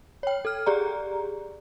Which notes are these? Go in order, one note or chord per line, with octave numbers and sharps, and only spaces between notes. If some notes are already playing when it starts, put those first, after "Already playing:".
C#5 G5
A4 F6
G4 G#4 D5 A#5